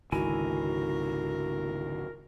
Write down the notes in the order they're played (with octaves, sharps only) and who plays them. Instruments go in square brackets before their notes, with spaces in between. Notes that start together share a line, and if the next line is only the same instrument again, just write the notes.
[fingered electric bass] G#1 C#2 D#3 [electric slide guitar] D3 E4 G#5 [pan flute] F#4 [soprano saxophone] A#4